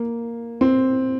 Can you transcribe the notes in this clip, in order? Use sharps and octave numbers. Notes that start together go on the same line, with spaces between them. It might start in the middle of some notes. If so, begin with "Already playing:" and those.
Already playing: A#3
C4